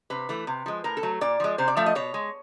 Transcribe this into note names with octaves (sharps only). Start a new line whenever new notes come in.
C3 B4
E3 A3
C3
F3 G#3
A2 A#4
A4
F#3 A3
A#2 D5
F3 G#3
C3 C5
D5
F3 A3 E5
D#5
B2 C#5
G#3